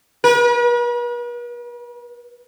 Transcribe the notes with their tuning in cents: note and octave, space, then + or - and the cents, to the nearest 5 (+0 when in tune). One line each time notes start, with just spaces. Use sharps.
B4 -45